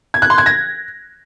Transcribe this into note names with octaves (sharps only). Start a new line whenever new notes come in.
G#6
F#6
C6
G#6
A#6